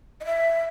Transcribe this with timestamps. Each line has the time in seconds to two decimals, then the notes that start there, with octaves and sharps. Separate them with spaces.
0.21 D#5
0.25 E5